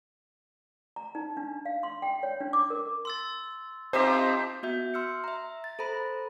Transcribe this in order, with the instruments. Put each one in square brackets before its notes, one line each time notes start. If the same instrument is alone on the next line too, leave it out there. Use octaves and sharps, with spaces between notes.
[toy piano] A#5
D#4
D4
F5
C6
G5
C#5
D4
D6
A#4
[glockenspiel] C6 E6 A6
[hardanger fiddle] C4 F4 [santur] D#4 G4 E5 [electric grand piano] C5 [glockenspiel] A5 D6
[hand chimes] B3 F#4 E5 G6
C6 E6 F6 C#7
E5 A#5
A6
A4 C5 A#5 B5